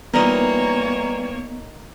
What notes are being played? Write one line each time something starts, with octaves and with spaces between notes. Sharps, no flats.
E3 G3 A#3 B3 D#4 F4 A#4 C#5